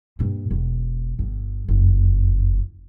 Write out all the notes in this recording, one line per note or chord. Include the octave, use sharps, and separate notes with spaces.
G2 A#3
E1
G1 G2
F#1 F2